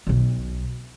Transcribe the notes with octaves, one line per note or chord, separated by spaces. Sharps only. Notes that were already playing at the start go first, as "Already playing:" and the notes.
B1 B2